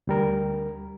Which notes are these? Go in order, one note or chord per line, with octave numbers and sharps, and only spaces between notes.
D2 G3 A#4